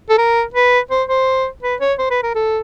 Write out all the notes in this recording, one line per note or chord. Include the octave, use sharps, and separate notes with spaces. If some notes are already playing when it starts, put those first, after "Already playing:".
A4
A#4
B4
C5
C5
B4
C#5
C5
B4
A#4
A4